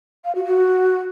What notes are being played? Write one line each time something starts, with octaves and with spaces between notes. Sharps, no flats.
F5
F#4
F#4